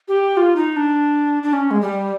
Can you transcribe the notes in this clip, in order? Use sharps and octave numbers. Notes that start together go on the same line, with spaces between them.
G4
F4
D#4
D4
D4
C#4
G#3
G3